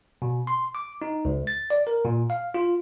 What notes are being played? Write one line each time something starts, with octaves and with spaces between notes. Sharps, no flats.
B2
C6
D6
D#4
C#2
A6
D5
A#4
A#2
F5
F4